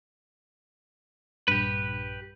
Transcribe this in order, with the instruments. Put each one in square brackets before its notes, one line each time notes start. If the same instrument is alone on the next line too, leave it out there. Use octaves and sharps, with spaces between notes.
[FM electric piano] A#1 G2 [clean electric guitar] G4 B4